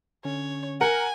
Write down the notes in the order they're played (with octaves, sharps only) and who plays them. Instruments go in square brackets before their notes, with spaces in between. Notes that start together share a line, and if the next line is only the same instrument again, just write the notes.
[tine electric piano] D3 C#4 [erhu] C#5
[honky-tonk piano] A#4 [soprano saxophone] F#5 [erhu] G#5